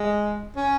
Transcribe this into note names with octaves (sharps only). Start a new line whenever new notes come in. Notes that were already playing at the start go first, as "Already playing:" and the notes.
Already playing: G#3
C#4